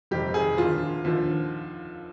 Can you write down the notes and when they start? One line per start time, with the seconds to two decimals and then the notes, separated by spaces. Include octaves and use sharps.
0.11 F1 F2 C3 D#3 G4
0.34 G#4
0.57 D#2 D3 F3 F4
1.05 D#2 D3 F3